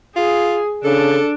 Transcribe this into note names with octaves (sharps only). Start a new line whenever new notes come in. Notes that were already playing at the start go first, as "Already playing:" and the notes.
F4 G#4
C#3 D4 A4